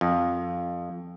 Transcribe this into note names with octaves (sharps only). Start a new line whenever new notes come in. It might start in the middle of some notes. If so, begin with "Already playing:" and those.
F2